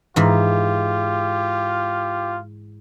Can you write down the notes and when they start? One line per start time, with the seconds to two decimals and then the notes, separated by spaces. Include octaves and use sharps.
0.16 G#2 E3 F4 G4